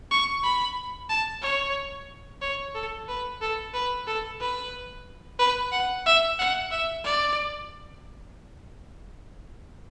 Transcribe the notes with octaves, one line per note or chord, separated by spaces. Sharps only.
C#6
B5
A5
C#5
C#5
A4
B4
A4
B4
A4
B4
B4
F#5
E5
F#5
E5
D5